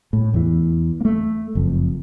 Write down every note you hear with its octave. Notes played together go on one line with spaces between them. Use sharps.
A2
E2 E3
A3 A#3
F#1 F2